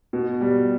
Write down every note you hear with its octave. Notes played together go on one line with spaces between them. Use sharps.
B2
G3